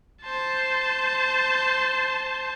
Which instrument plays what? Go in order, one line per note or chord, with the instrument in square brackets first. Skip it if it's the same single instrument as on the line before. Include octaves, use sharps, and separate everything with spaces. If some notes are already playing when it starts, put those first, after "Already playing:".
[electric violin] C5 A5